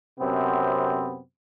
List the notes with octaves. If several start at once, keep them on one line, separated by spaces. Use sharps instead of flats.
F#2 C3 B3 C4